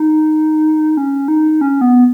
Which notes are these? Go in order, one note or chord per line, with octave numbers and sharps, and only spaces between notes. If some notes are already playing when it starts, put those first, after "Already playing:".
Already playing: D#4
C#4
D#4
C#4
B3